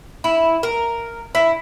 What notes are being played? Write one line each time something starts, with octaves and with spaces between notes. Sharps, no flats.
E4
A#4
E4